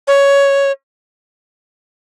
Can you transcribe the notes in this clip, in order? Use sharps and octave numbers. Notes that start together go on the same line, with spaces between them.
C#5